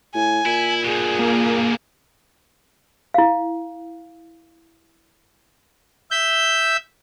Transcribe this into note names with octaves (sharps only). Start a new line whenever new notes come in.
A2 G#5
A#2 E4
G2 B2 G#4
A#3
E4 F5
E5 G6